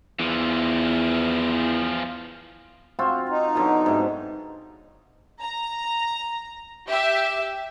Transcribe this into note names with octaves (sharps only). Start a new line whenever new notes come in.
E2 E3 F3
C4 F4 F#4
D#4
B2 D3 F#3
G#2 C3
A#5
G4 E5